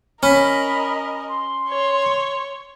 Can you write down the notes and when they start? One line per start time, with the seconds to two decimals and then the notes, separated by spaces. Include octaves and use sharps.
0.23 C#4 A#4 D#5 B5
1.29 C6
1.68 C#5